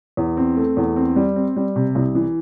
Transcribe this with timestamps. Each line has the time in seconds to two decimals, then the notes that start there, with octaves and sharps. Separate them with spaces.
0.17 E2
0.37 C4
0.57 A3
0.77 E2
0.96 C4
1.16 G3
1.36 C4
1.56 G3
1.76 C3
1.95 C2
2.15 E3